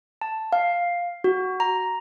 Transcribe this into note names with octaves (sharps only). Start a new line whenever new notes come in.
A5
F5
F#4
A#5